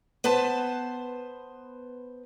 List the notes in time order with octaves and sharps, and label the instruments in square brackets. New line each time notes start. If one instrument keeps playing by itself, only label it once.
[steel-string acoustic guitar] B3 B4 C5 A5